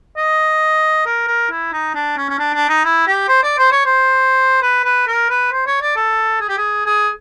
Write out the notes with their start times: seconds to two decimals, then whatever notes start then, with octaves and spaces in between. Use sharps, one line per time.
0.17 D#5
1.06 A#4
1.27 A#4
1.51 E4
1.72 D#4
1.94 D4
2.17 C#4
2.29 C#4
2.39 D4
2.54 D4
2.69 D#4
2.84 E4
3.07 G4
3.28 C5
3.43 D5
3.58 C5
3.72 C#5
3.85 C5
4.62 B4
4.84 B4
5.07 A#4
5.30 B4
5.52 C5
5.67 C#5
5.81 D5
5.96 A4
6.40 G#4
6.49 G4
6.57 G#4
6.86 G#4